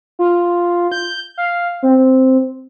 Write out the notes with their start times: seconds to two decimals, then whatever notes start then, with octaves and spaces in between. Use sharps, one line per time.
0.19 F4
0.92 G6
1.38 F5
1.83 C4